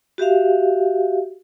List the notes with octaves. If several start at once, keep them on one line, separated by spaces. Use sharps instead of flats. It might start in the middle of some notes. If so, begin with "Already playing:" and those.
F#4 G4 E5 F5